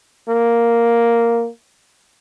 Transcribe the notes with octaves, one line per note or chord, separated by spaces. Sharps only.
A#3